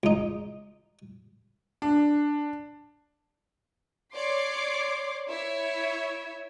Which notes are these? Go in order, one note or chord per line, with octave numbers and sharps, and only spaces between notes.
C#2 D#4
D4
C#5 D5 C6 D6 C7
E4 C#5 E5